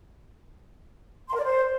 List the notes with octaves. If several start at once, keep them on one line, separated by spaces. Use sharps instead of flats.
C6
A#4
D5
C5